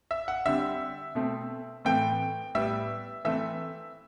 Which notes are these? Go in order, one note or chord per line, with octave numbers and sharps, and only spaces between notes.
E5
F#5
D3 G3 C4 E5
B2 A3 C4
A2 E3 A3 C4 G5
A2 G3 B3 E5
E3 A3 C4 E5